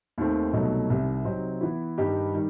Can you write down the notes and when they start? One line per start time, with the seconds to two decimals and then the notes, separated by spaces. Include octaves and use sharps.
0.18 D#2 D#3 A3 C4
0.53 C2 B2 F#3 A3 D#4
0.90 C2 C3 D#3
1.25 C3 F#3 C4 D#4
1.61 E3 B3 E4
1.98 G2 D#3 G3 D#4 G4
2.34 D#3 G3